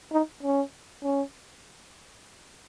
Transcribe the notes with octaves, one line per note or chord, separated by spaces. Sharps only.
D#4
C#4
C#4